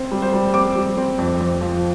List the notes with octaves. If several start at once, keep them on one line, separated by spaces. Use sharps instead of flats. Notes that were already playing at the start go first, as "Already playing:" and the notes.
Already playing: C4 C5
G3
C5
G3
C4 D6
G3
C4
F2
F2
F3